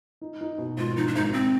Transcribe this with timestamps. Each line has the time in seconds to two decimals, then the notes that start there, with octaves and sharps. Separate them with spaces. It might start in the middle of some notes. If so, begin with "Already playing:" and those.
0.21 D#4
0.41 D#4
0.58 B2
0.77 G#1 F4
0.96 F3 D#4
1.07 D4
1.15 G#1 D#4
1.33 G#1 C4